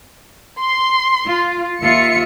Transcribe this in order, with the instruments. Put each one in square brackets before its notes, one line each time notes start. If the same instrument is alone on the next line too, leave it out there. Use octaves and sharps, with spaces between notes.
[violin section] C6
[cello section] F4
[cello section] D#2 F4 E5 [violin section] C#7